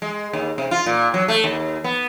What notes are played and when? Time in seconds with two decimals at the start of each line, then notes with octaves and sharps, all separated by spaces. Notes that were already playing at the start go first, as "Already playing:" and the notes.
0.02 G#3
0.33 D#2
0.58 C3
0.71 F4
0.86 A#2
1.14 F#3
1.28 A3
1.44 D#2
1.84 B3